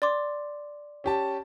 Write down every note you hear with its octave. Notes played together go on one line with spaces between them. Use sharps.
D5 C6 D6
C#4 G4 A5